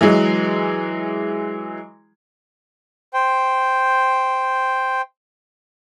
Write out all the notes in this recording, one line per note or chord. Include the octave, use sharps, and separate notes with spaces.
E3 F#3 G#3
C5 G5